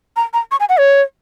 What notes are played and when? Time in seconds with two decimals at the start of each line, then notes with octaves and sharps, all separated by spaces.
0.16 A#5
0.33 A#5
0.51 C#6
0.60 G#5
0.69 F#5
0.77 C#5